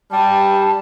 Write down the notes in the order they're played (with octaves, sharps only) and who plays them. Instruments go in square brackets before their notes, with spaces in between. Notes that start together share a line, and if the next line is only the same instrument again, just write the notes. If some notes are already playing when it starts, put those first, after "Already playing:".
[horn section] G3 [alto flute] A5